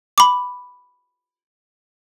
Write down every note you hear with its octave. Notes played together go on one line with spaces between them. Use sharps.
B5 D6